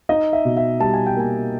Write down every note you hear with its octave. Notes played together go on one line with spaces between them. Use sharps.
D#4 D#5
E5
B2
E5
G3 A5
G#5
G5
A#3 G#5